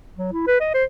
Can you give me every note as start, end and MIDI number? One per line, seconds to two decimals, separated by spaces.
0.18 0.30 54
0.33 0.47 64
0.47 0.59 71
0.60 0.69 75
0.74 0.84 72